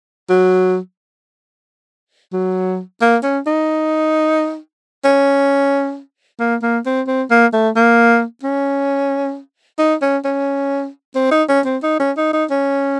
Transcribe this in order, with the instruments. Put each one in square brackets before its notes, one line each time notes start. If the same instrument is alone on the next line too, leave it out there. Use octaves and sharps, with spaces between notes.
[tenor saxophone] F#3
F#3
A#3
C#4
D#4
C#4
A#3
A#3
C4
C4
A#3
A3
A#3
C#4
D#4
C#4
C#4
C4
D#4
C#4
C4
D#4
C#4
D#4
D#4
C#4